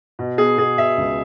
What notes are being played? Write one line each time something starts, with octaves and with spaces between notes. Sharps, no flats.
B2
B3 G#4
B2 G#4
B2 E5
C#2